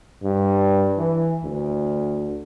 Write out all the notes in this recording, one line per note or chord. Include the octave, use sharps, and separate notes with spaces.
G2
E3
D2